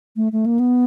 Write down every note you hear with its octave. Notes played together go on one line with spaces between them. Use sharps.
A3
A3
A#3
B3